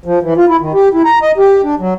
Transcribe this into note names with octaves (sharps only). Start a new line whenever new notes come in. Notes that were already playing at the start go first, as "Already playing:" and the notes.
F3
E3
F4
E4
D#3
G4
E4
A#5
D#5
G4
D4
F#3